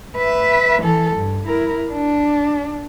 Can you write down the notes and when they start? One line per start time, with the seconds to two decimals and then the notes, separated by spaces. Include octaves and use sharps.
0.17 B4 E5
0.82 E3 A4
1.16 G2
1.46 E4 A#4
1.92 D4